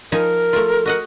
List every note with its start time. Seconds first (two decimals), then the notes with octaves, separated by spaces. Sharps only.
0.12 F3 D#4 A#4 G#5
0.53 A3 F4
0.86 F#4 D#5 F#5